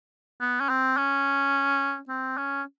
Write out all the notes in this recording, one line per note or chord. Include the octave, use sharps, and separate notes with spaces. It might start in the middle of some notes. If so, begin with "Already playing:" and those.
B3
C#4
C4
C#4
C4
C#4